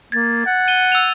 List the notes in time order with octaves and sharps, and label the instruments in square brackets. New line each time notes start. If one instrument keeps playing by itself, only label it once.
[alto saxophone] A#3 [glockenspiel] G#6 A6
[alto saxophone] F#5
[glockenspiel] D#7 G7
E6 F7